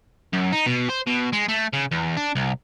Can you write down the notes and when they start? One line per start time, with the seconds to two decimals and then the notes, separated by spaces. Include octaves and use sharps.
0.33 F#2
0.53 D#4
0.66 B2
0.89 C5
1.07 B2
1.33 G#3
1.49 A3
1.73 C#3
1.92 E2
2.17 D4
2.36 C2